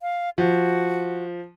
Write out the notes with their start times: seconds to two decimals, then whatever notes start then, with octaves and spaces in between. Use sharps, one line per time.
0.02 F5
0.38 F3 F#4